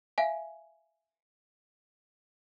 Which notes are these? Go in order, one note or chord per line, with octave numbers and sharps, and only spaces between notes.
E5 F5 G#5